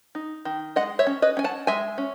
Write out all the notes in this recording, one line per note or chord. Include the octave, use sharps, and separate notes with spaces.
D#4
D#3
G#3 D#5 F#5
C#5 E5
C#4
B4 D#5
C#4 G#5
F#5 A5
G#3 E5 G#5
C#4